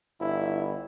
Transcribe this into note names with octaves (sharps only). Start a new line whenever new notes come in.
G1 E4